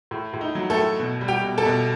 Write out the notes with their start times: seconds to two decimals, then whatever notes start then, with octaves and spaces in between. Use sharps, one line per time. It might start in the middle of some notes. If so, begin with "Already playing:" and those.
0.11 A2
0.34 A2
0.41 D#4
0.55 F#3
0.70 A3 A4
0.77 A2
0.99 B2
1.21 G3
1.28 G4 G5
1.43 B2
1.58 A4 A5
1.65 B2